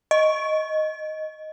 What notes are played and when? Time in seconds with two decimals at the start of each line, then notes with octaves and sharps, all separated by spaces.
0.11 D#5